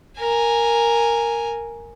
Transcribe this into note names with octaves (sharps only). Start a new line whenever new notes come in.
A#4 G#5